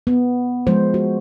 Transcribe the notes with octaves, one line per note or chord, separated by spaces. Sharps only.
B3
F3 G#3 C5
F#4